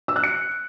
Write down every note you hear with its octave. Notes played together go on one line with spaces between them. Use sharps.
E6
F#6
C#7